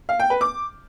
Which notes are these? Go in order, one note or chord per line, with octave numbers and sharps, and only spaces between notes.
F5
G5
B4
D6